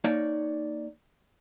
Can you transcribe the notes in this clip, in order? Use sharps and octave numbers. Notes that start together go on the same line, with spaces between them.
A#3 D#4 C#5 D5